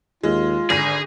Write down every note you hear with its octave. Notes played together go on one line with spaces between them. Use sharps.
D#2 G#3 F4
G#1 D3 G#4 A#6 D#7